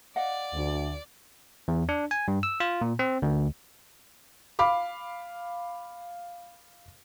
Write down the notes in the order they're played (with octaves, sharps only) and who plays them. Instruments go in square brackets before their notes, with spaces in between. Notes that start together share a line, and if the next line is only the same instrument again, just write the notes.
[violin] D5 [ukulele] D#5 F5 F#5
[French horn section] D2
[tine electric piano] E2
D4
G#5
G2
E6
F4
A#2
C4
D2
[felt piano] F5 B5 D6